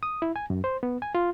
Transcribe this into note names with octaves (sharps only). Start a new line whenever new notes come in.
D#6
E4
G#5
F#2
C5
B3
G#5
F4